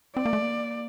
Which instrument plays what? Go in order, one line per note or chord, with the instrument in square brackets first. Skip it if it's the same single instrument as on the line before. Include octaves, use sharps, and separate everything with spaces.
[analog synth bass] C4 [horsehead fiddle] D5
[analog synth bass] A#3
A3
A#3